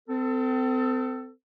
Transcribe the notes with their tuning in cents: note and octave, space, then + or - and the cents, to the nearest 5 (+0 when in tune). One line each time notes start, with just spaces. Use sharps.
C4 -35 A4 +20